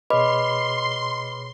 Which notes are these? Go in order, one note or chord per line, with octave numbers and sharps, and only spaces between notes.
B2 G#4 B4 C#5 D#5 B5 C6 D6